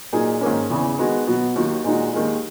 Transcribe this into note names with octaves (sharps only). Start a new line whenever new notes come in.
A#2 F#3 A#3 D#4 G#4
G#2 D#3 A#3 C#4
E2 C#3 E3
D#3 G#3 B3 F#4
B2 F#3 B3 F#4
D#2 D#3 F#3
A#2 G#3 D#4 F#4
D#2 D#3 G#3